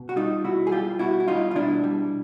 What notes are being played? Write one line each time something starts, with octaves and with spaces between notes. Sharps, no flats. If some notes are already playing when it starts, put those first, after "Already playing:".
Already playing: B2
F#4
G3 D#4 F4
B2 E4 F#4
G#4
G3 F4 G4
B2 E4 F#4
E4
G3 D#4 F4
F4
B2 D4 E4
G3